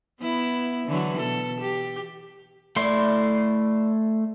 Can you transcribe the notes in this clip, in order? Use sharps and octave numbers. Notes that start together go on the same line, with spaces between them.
B3 E4
D3 E3 F#3
B2 A4
G4
A3 E4 D5 C6